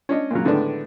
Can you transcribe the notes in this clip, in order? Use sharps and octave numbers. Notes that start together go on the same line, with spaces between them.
C#4 D4 D#5
A#2 C#3 F#3
A2 D3 D#3 G#3 B3 D4